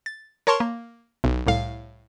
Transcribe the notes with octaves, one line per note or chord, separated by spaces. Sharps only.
A6
A#4 C#5 A5 C6 C#6
A#3
B1
C2 A2 F5